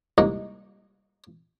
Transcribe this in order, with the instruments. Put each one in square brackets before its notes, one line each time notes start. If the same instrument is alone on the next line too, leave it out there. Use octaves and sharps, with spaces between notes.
[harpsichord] C2 G#2 A#3 D#5